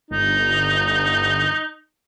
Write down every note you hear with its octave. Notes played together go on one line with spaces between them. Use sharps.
G1 D#4